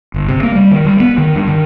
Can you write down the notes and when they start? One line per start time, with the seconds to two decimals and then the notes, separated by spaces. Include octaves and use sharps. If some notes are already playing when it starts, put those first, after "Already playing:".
0.14 G1
0.29 C3
0.43 A#3
0.55 G3
0.71 D#3
0.85 G3
1.00 B3
1.18 D#3
1.35 G2
1.48 D#3